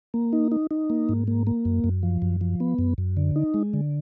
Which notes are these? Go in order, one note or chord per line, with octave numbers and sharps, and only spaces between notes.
A#3
D#4
D#4
D#4
A#3
G#2
A#3
A#3
F#2
F#2
F3
F#2
F3
B3
F#2
F#2
D3
D#4
G#3
D3